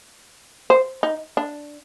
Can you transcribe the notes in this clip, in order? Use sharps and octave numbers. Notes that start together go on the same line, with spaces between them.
C5
D#4
D4